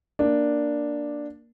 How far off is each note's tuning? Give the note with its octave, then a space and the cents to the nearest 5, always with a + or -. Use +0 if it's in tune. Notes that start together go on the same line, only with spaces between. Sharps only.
A#3 +10 D4 +0